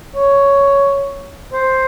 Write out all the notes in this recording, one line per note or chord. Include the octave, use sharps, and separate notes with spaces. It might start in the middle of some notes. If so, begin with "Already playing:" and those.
C#5
C5